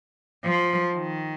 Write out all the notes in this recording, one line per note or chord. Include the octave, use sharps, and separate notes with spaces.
F3
D#3